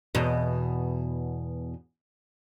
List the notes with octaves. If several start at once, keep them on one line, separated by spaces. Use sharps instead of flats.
E2 B2